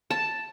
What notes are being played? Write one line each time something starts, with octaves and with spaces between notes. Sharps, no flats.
A5